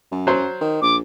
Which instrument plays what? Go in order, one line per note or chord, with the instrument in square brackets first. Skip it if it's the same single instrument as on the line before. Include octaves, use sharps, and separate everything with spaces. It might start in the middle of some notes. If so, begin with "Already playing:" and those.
[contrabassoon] F#2
[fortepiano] F#3 C5
[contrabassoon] D#3
[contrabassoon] A#1 [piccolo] D6